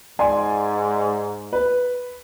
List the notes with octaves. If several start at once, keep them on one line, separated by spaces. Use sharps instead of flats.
G#2 D5 G#5 C6
B4